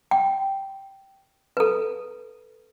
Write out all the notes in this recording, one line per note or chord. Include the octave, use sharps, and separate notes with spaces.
G5
A4 B4